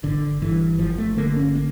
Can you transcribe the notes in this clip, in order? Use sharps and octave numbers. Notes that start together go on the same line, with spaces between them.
G1 D3
G2 E3
G1 F3
A3
D3 A#3
C#4
A#3